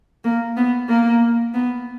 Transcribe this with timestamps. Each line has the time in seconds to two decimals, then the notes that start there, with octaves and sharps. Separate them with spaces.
0.24 A#3
0.57 B3
0.89 A#3
1.54 B3